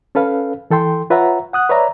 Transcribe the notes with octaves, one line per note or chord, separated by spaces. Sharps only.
C#4 A4 B4 F5
E3 A4 G5 C6
F4 B4 C#5 E5 F#5 A#5
F#5 D#6 F#6
B4 C#5 D5 E5 A#5